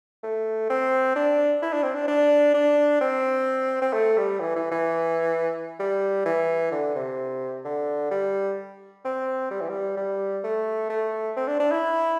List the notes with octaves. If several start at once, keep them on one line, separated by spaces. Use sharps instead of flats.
A3
C4
D4
E4
D4
C4
D4
D4
D4
C4
C4
A3
G3
E3
E3
E3
G3
E3
D3
C3
D3
G3
C4
G3
E3
G3
G3
A3
A3
C4
D4
D4
E4